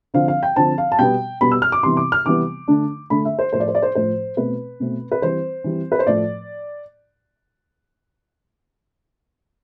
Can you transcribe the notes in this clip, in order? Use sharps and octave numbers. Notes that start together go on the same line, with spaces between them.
D3 F3 C4 F5
F5
G5
D3 F3 C4 A5
F5
A5
B2 G3 B3 G5
B2 G3 B3 B5
E6
F6
D6
C3 E3 G3 B3 C6
D6
F6
C3 E3 G3 B3 D6
D3 A3 D4
D3 A3 D4 B5
E5
C5
A2 F3 A3 C5
D5
C5
D5
C5
A2 F3 A3 C5
B2 A3 C4 B4
B2 A3 C4
B4
E3 G3 C4 C5
E3 G3 C4
B4
C5
A2 F3 A3 D5